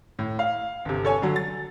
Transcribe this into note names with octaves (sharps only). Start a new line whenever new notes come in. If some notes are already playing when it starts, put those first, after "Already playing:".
A2
F5
G1 C3
A4 C#5 G#5
D3 F#3
A6